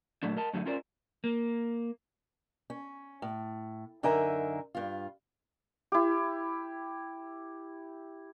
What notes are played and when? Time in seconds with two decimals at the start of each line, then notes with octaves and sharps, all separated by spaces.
0.23 A#2 F#3 A3 D4
0.37 A#4 D#5 A5
0.53 F#2 D3 F#3 A3 D#4
0.66 C#4 F4 A#4 C5 D5
1.24 A#3
2.70 C#4
3.22 A2
4.03 F#2 D3 D#4 A#4 E5 G#5
4.75 G2 F4
5.92 E4 G4